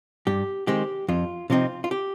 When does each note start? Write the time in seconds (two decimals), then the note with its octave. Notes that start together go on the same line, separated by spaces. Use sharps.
0.27 G2 G4
0.67 D#3 G#3 C4 G4
1.08 F2 F4
1.50 C3 F3 C4 D#4 F4
1.84 F4
1.91 G4